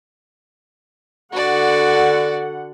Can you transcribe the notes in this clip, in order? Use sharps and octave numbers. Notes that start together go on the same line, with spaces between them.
D3 F#4 D5 F#5